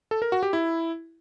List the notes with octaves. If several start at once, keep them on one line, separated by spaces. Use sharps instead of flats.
A4
A#4
F#4
G4
E4